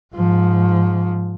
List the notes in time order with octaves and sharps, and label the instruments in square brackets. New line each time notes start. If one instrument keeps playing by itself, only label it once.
[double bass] G#2 F3